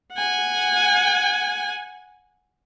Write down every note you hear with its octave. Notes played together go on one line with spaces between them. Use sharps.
F#5 G#5